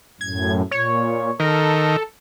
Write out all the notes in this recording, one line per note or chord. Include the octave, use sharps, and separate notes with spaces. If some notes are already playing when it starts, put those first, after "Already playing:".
F#2 A2 G#6
A#2 C#5
D#3 A4 A#4